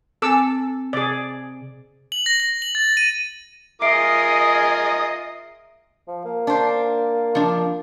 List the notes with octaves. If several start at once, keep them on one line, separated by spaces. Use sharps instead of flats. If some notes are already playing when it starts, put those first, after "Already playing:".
C4 A4 G#5 D6 E6
C3 G#4 D5
F#7
A#6
A#6
F#7
A6
D#7
F4 G#4 A#4 D#5 E5 D#6 C7 D7
F3
A#3
D4 C5
F3 D4